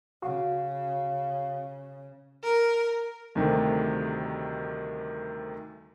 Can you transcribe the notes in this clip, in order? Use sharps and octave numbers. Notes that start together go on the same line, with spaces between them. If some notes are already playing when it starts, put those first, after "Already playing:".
C#3 F#4 F5
A#4
D2 C3 D#3 G3 A3